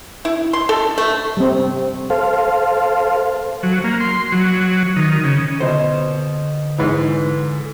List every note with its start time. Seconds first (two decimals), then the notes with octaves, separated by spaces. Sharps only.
0.25 E4
0.53 C6
0.69 A4
0.98 A3
1.37 G3 C4
2.10 A4 C5 F5
3.63 F#3
3.84 A#3
4.01 C6
4.32 F#3
4.96 D#3
5.24 C#3
5.60 B2 D3 C5
6.78 G#2 E3